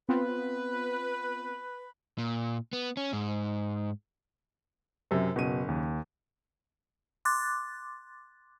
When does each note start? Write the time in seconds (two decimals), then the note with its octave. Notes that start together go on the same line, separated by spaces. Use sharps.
0.09 B3 C4 F4 B4
2.18 A#2
2.73 B3
2.97 C#4
3.13 G#2
5.11 F#2 C3
5.36 F#1 B2 D#7
5.68 D#2
7.25 C6 D6 F#6 A6